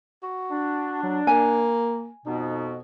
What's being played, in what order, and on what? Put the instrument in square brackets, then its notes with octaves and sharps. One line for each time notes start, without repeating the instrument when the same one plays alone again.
[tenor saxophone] F#4
[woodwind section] D4
[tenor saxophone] F#3
[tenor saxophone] A#3 [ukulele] G#5
[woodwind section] F2 B2 B3 [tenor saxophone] D#4